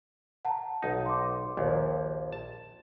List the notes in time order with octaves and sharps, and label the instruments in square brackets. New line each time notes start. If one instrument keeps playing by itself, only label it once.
[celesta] F#5 A5 A#5
[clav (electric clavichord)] B1 D#4
[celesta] C6 D6
[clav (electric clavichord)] A#1 D#2
A5